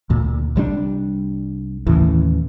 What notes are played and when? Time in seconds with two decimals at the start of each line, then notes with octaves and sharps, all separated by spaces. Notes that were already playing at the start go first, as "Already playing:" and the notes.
0.10 D2 A#2
0.56 C2 G3 G#3 D4
1.87 D#2 A2 C#3 E3